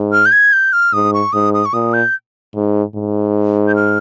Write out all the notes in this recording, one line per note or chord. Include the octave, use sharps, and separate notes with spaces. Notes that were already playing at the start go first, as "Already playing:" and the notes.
Already playing: G#2
F6
G6
G#6
G6
F6
G#2 D#6
C#6
G#2 D#6
D#6
C#6
A#2 D#6
G6
G#2
G#2
G6
F6